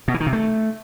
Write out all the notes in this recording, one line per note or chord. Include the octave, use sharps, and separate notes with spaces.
B2
E3
D#3
C3
A3